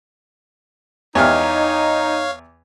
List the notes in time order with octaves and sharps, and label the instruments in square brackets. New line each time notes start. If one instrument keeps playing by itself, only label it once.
[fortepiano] E2 G4 F6 [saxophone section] D#4 [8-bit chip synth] C#5 F5